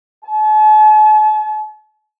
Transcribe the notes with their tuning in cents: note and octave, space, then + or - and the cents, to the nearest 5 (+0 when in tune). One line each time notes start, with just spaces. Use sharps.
A5 -45